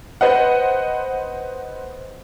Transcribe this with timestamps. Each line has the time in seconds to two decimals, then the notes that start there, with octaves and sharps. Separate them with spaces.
0.21 B4 C5 D#5 F#5